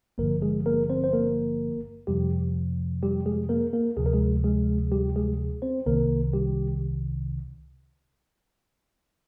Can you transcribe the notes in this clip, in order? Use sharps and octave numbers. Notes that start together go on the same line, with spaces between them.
G#1 G2 D3 F3 A#3 A#4
G#3 G#4
A#3 A#4
C4 C5
C5
A#3 A#4
F2 C3 F3 G3 G4
G3 G4
G#3 G#4
A#3 A#4
A#3 A#4
D2 C3 F3 G#4
A#4
G#3 G#4
G#3 G#4
G3 G4
G#3 G#4
C4 C5
C2 C3 D#3 A#3 A#4
G3 G4